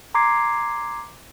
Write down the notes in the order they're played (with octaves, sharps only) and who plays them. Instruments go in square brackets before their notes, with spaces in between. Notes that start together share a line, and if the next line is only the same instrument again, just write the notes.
[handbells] A#5 C6 D6 G#6 C7